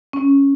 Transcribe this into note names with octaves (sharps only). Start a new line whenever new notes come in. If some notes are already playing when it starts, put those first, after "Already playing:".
C#4